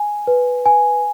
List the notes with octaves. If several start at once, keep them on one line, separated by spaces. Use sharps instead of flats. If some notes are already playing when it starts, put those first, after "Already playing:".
Already playing: G#5
B4
G#5